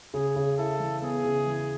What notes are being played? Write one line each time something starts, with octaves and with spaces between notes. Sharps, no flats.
C#3 G#4
C#3
E4 A4
E3
B3 G#4
C#3
E3